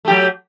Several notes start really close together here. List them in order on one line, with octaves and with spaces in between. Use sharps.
A3 G4 F#3